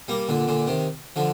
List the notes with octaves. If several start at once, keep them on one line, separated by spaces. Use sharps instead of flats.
G3 A#3
A#2 D3
A#2 D3
C3 D#3
D3 F3